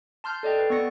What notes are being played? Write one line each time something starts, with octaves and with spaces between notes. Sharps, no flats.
A5 C6 F6 G6
A4 D5 D#5 G5
B4
B3 D5 C#6 A#6 C#7